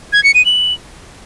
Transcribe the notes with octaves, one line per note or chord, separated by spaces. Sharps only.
G#6
C#7
D#7
F#7